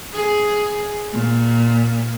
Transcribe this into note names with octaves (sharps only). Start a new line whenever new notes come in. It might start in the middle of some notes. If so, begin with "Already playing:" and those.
G#4
A#2